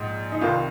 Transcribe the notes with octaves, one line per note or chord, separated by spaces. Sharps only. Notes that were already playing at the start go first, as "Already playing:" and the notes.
Already playing: A#1 G#2
D#4
C2 C3 D#3 F4